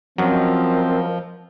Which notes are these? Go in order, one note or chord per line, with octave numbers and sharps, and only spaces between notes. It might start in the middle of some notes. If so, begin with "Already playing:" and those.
F#2 F3 F#3 C4 A#4 D#5